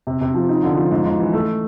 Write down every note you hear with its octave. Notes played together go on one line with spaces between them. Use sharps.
C3
C3
F3
D#4
D3
F3
G#2
G#2
E3
A3